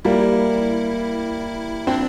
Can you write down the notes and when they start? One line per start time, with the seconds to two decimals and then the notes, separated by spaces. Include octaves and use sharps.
0.04 G3 A#3 E4
1.87 C4 D4